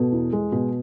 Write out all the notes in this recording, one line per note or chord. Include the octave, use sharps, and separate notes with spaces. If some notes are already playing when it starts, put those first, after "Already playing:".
Already playing: B2 A4
E2
G#3
B2